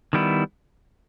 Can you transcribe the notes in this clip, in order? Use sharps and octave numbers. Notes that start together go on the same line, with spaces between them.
D#3 G3 B3 E4